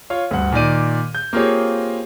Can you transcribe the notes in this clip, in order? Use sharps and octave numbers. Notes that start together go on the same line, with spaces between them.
F4 C#5 F5
D2 G2 F#5
A#2 D#3 D5 D#7
G6
A#3 C4 F4 G4 G#4 C#5